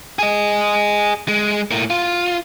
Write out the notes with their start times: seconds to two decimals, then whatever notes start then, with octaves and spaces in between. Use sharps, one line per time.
0.19 G#4 D#5
1.28 G#3
1.71 A2 A#3
1.90 F4